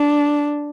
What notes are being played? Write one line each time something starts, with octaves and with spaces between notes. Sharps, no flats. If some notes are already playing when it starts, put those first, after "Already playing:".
Already playing: D4